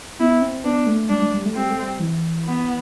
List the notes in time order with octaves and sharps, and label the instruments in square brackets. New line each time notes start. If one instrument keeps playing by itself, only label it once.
[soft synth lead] B3 [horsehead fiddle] E4
[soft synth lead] C4
[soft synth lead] B3 [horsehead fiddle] D4
[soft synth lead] A3
[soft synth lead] G3 [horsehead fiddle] D4
[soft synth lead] A3
G3
A3
[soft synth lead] G3 [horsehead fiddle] C4
[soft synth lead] A3
G3
E3
[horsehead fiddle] B3